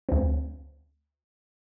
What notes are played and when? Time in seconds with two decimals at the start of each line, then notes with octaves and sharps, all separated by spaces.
0.09 D2 C4